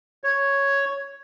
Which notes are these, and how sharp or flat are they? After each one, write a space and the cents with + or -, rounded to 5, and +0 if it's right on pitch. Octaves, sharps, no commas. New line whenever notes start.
C#5 +0